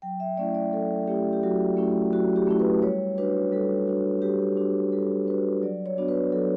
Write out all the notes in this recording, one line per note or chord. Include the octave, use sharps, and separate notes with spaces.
F#3 G5
E5
A3 C#4 E4 D5
D5
F#3 A4
A3 C#4 E4 G4
G4
F#3 F#4
A3 C#4 E4
F#3 F#4
G4
A3 C#4 E4
B4
G3 C#5
D4 F#4 B4
G3 A4
D4 F#4
G3 G4
D4 F#4
G3 A4
D4 F#4 B4
F#3 D5
C#5
B3 D4 F#4
B4
F#3 A4